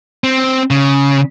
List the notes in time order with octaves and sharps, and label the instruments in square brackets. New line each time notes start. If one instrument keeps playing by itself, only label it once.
[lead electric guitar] C4
C#3